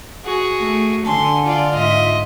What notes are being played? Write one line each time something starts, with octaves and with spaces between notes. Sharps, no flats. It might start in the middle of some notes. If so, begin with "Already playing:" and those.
F#4 G#4
A3
D3 G#5 A5 C6
F4 D5
G#2 F4 D#5 E5 C6